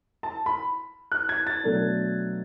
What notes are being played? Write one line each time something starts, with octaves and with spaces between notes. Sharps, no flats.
A5
B5
F#6
G#6
A6
B2 F#3 A3 D4